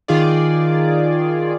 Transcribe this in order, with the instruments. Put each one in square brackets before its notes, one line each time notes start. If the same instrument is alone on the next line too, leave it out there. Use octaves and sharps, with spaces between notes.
[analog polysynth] D#3 F4 G#4 D5